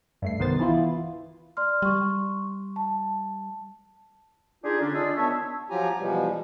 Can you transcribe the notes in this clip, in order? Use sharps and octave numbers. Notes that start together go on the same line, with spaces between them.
G2 A3 C7
C2 D#3 B3 C5 A6
E3 B3 E4 F4
D5 C6 F6
G3 C6 C#6
A5
D4 D#4 F4 G4 G#4
D3 C#4 D4
G#3 D4 F4 G#4 A4 D5
D#3 B3 D4 C#5 E5 A5
F3 F#3 F4 G4 G#5 A#5
B2 E3 F3 G3 G#3